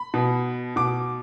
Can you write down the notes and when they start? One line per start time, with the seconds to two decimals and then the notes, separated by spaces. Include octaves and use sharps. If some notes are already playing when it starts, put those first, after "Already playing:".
Already playing: B5
0.14 B2
0.76 B2 D6